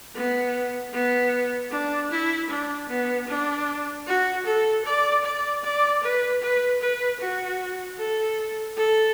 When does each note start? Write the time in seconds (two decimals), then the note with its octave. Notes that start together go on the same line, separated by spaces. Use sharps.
0.15 B3
0.94 B3
1.71 D4
2.11 E4
2.50 D4
2.89 B3
3.28 D4
4.07 F#4
4.46 A4
4.85 D5
5.25 D5
5.64 D5
6.03 B4
6.42 B4
6.81 B4
7.20 F#4
7.99 A4
8.77 A4